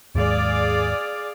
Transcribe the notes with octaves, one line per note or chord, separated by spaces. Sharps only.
D#2 G#2 G#3 G#4 D5 F5